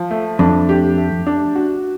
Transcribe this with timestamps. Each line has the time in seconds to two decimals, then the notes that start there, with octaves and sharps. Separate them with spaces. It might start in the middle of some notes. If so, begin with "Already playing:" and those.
Already playing: F3
0.11 A3
0.39 F2 D4
0.69 G4
0.98 A3
1.27 D4
1.56 F#4